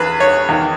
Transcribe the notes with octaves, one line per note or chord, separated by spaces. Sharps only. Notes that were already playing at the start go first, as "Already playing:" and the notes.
Already playing: E2 G#4 B4
C#5
E2 D#3